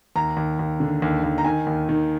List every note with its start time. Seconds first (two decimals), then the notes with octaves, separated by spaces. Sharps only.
0.16 D#2 A#5
0.37 D#2
0.59 D#2
0.80 D3
1.02 D#2
1.23 D#2
1.38 A#5
1.45 D#3 G#5
1.67 D#2
1.89 D#3